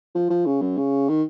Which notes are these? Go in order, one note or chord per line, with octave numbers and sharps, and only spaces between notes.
F3
F3
C#3
F#2
C#3
D#3